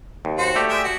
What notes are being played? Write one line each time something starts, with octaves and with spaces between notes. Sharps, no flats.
D#2
F#4 C5
A3 G4 D5
G#3 E5 G5
F#4